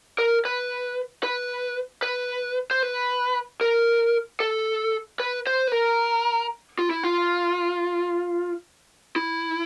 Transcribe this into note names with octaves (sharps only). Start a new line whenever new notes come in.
A#4
B4
B4
B4
C5
B4
A#4
A4
B4
C5
B4
A#4
F4
E4
F4
E4